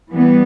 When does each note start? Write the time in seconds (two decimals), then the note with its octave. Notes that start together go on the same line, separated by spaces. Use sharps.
0.09 E3 G3 B3